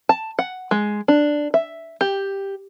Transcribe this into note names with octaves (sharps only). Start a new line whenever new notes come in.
A5
F#5
G#3
D4
E5
G4